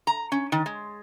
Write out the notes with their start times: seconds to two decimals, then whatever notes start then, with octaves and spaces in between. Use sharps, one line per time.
0.07 A#5
0.32 C#4
0.52 D#3
0.66 G#3